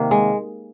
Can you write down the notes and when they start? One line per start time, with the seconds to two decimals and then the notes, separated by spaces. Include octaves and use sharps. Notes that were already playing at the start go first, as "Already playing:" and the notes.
Already playing: C3 D#3 A#3
0.11 G#3